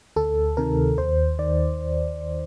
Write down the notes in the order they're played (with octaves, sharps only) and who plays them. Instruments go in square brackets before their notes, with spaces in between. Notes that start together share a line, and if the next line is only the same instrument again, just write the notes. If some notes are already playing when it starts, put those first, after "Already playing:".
[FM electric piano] D2 A4
C3 D#3 A#4
D#2 C5
D#3 D5